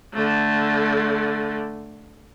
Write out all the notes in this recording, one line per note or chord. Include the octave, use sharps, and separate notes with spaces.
D3 A3